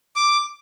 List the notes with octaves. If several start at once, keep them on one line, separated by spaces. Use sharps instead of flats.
D6